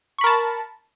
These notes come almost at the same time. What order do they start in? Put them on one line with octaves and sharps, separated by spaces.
C#6 B5 A#4 A5